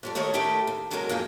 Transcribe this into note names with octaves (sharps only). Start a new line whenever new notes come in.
F2 G3 D4
D#2 D#3 A3 A#4 C#5 D#5
D#3 A3 E4 G4 A4 A#4
D#2
E2 B2 F#3 G#3 G#4 A#4
F2 A#3 D#4 G#4 G5